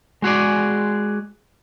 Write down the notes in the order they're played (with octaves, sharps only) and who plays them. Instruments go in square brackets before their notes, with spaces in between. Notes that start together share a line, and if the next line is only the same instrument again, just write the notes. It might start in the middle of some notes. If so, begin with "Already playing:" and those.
[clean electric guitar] G#3 F#4 G#4 D5